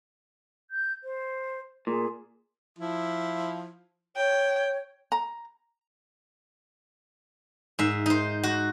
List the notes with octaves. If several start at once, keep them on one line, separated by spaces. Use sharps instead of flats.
G6
C5
A#2 G#4
F3 E4
C#5 G5
A#5
G#2 E5
D#4 C5
F#4